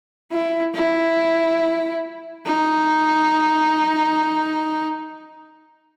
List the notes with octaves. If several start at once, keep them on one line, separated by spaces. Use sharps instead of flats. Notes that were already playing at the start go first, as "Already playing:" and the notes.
E4
E4
D#4